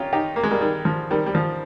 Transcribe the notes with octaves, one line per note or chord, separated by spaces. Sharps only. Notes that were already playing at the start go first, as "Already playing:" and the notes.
Already playing: C#4 D#4 F4 G4
D#4 G4
A#3
G#3
G3 A#3
D#3 G3
F3
D#3 G3
G3
F3